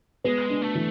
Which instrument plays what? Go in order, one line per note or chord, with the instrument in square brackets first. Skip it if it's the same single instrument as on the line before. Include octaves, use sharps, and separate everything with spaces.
[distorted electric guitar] G#3 [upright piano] B3
[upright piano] D4
[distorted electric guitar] A3
[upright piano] E3